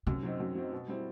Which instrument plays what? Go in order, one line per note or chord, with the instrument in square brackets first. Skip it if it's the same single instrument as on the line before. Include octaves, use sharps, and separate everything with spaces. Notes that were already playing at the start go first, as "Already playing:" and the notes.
[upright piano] F#2 [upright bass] C3
[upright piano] F#3 C4 D#4
F#2
F#3 C4 D#4
B2
G3 C4 E4